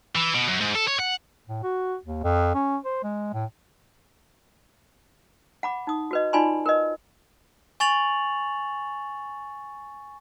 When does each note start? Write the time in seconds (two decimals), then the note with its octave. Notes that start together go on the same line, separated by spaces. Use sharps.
0.16 E3
0.35 B2
0.48 F#2
0.61 G#2
0.75 A4
0.88 C#5
0.99 F#5
1.48 A2
1.63 F#4
2.05 D#2
2.24 F2
2.55 C#4
2.85 C5
3.04 G#3
3.34 A2
5.63 F#5 B5 D6
5.87 D#4 D#6
6.11 F#4 B4 D#5
6.33 D#4 F4 D5 G#5 B5 C6
6.66 A#4 B4 D#5
7.80 G#5 C#6 A6 F7 F#7